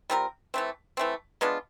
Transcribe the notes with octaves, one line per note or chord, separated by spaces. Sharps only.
G3 C4 F4 A#4
E3 A3 C4
E3 A3 C4
G#3 B3 D4 F4